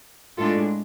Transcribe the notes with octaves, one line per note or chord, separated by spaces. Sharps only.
A2 G#3 D4 F4 A4